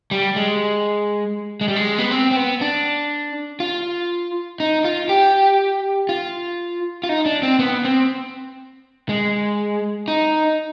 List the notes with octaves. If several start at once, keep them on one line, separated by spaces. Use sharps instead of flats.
G3
G#3
G#3
G3
G#3
B3
C4
C4
B3
D4
F4
D#4
F4
G4
F4
F4
D#4
D4
C4
B3
C4
G#3
D#4